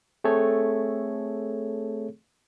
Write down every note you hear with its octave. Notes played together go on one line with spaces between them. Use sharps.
A3 C4 G#4 A4 C#5